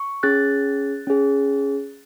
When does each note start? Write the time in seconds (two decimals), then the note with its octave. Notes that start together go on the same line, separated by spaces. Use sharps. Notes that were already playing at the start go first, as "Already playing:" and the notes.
Already playing: C#6
0.23 C#4 G#4 F#6 A6
1.07 C#4 G#4